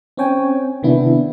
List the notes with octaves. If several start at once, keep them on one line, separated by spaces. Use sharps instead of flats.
C4 C#4 C#5 G5 G#5
C3 D#3 B3 D4 E4